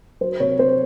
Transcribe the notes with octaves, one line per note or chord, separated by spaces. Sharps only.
F#3 C5
C3 C#5
C4 C5